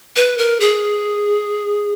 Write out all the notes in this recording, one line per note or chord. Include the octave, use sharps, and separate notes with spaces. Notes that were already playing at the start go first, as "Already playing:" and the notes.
B4
A#4
G#4